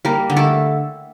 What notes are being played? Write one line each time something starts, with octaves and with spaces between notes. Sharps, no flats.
G3 A#3 A#4
D3
A3 A4